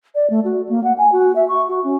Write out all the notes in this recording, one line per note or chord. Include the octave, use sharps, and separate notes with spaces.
D5
A3
F#4
A#3
F#5
G#5
F#4
E5
C#6
F#4
C#4